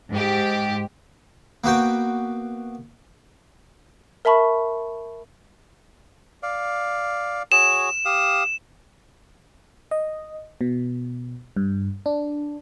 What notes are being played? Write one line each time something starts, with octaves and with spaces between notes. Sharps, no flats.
G#2 G4
A#3 B3 F#4 G5
A#4 E5 A5 B5 C#6
D5 F5
F#4 G#4 C#5 E7
G4 F5 D#6
D#5
B2
G2
D4